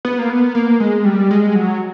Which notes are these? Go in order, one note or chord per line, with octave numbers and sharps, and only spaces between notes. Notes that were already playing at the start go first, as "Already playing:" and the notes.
B3
A#3
B3
A#3
G#3
G3
G#3
F#3